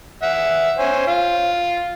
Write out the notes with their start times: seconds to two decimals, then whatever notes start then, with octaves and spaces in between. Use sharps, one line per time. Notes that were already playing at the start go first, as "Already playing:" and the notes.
0.23 E5 F#5
0.78 C5 C#5 G#5
1.07 F4 F5